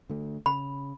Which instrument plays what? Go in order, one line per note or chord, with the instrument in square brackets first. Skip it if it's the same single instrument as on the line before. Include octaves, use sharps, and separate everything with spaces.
[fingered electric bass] D3 A3
[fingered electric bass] C#3 [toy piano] B5